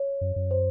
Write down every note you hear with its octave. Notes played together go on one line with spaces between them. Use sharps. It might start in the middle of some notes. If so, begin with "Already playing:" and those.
Already playing: C#5
F#2
F#2
C5